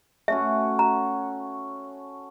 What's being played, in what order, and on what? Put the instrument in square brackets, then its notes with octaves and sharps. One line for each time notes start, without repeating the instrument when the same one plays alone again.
[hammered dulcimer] A3 C#4 F#4 [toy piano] E5
[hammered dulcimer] F#4 [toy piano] A#5